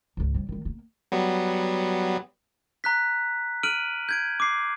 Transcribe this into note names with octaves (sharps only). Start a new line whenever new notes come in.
C#2 G#2
F3 G3
D#3 G3
A#3
F#3 G3 B3
A#5 F#6 B6
F6 D7 D#7 F#7
G6 G#6 D7
D6 C7